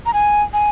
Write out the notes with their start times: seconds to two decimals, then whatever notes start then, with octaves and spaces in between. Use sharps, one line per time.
0.06 A#5
0.14 G#5
0.53 G#5